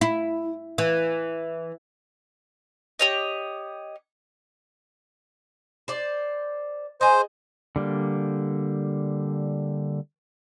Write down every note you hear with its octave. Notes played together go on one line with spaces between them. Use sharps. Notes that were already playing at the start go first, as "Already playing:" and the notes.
E4
E3
G4 C#5 D#5
C5 D5
G#4 C5 D#5
D3 G3 A#3